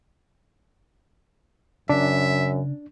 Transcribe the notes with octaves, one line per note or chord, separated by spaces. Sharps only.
F#2 C#3 C#4 D4 E5